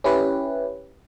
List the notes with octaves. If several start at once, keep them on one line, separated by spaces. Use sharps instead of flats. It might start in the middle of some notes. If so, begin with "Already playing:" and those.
C#4 E4 G4 B4